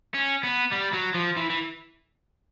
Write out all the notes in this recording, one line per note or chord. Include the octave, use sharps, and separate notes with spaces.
C#4
B3
G3
F#3
F3
E3
E3